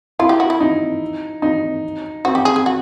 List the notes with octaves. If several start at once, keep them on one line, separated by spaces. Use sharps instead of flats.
E4 F4
G4
F#4
E4
D#4
D#4
C4 F#4
G4
G#4
G#4
F#4